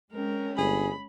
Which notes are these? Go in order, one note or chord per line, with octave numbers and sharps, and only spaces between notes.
G#3 C4 C#4 A#4
G1 G#4 B5